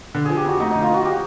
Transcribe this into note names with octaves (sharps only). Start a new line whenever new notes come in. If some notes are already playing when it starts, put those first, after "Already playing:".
D3
F3 G#4
G4
F2 F#4
A3 D#4
D3 D#4
F4
F3 F#4
G4